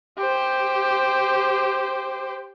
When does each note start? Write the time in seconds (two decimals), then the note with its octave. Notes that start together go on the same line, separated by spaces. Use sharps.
0.18 G4 C5